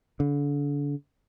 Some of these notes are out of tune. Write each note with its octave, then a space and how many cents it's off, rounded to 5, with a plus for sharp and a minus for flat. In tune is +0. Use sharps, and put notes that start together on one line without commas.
D3 -35